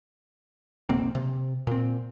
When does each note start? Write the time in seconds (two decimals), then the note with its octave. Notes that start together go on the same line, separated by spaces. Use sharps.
0.89 F1 B1 A#3 C4
1.15 C3
1.67 A#2 C4